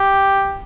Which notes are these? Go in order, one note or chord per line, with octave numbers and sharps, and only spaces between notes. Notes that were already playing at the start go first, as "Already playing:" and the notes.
Already playing: G4